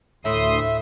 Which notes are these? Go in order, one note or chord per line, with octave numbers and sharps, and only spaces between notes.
D2 A2 E5 C6 D#6